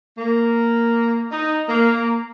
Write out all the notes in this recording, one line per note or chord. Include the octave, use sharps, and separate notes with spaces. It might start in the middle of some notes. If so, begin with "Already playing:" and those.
A#3
D#4
A#3